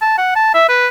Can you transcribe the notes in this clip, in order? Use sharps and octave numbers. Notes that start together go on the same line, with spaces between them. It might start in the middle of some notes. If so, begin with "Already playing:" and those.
A5
F#5
A5
E5
B4